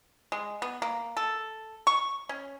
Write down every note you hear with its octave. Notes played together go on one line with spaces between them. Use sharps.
G#3
B3
A#3
A4
C#6
C#4